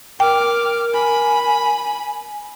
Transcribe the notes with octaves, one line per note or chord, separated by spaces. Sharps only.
A#4 G5 D6 F6
G#5 B5